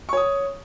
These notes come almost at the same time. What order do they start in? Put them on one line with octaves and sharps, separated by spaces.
C#6 C#5 D#6